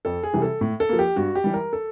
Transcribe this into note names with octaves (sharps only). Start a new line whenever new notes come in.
F2 A4
G#4
C3 E3 G3
A4
A2
A4
F3 A#3
G4
G2 F#4
G4
E3 G3
A#4
A4